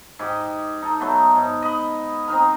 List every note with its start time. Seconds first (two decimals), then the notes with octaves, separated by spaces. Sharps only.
0.19 G#2 G4 D#5
0.82 D#4 A4
1.00 F#3 A3 B3
1.36 G#2
1.62 D#5 B5
2.28 C4 D#4 A#4